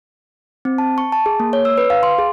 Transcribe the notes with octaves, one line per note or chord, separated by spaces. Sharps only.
C4
A5
C#6
A5
G#4
A#3
C#5
E6
B4
F5
C6
G#4